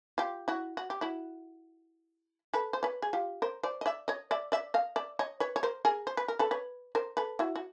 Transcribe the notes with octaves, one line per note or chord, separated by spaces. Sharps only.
F4 G4
E4 F#4
F#4
G4
E4 F#4
A4 B4
C5
B4 C#5
G#4
F4 G4
A#4 C5
C5 D5
D#5
D5 E5
C#5 D#5
D5 E5
D5 E5
D#5 F5
D5 E5
C#5 D#5
B4 C#5
C#5
A#4 C5
G#4 A#4
C5
B4
A#4
A4 B4
B4 C#5
A#4 C5
A4 B4
E4 F#4
F#4